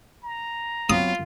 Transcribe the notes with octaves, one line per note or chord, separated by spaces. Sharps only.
A#5
F#3 B3 C4 F4 D#6